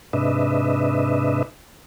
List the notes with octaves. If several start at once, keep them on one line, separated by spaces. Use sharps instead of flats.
G#2 C3 D4 B4 D#5 E5